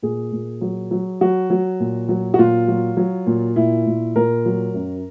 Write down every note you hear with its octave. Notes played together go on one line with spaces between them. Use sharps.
A#2 G#4
A#2
F#3
F#3
F#3 F#4
F#3
A#2
F#3
F#4
A#2 F4
F#3
F#3
A#2
A#2 E4
A#2
A#2 A#4
F#3
F#2